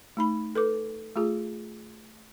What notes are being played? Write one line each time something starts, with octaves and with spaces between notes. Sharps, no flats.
A3 D#4 B5
A4 B4 D6
A3 F4 G#4